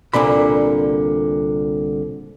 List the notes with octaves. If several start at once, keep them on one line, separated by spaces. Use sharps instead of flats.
C2 A#2 D3 B5